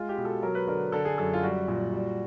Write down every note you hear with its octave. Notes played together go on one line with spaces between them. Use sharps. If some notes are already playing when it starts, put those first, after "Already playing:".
Already playing: G#3 F4
G4
B2
A4
F#3 A#4
B4
D3 A#4
D3 A4
G#4
F#2 A4
F4
G3 F#4
A#2
G3